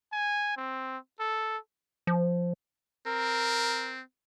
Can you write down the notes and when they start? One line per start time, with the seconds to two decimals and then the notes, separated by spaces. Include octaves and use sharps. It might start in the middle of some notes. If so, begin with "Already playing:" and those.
0.13 G#5
0.57 C4
1.20 A4
2.07 F3
3.07 C4 A#4